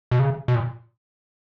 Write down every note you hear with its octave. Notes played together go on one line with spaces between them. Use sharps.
B2
C#3
B2
A#2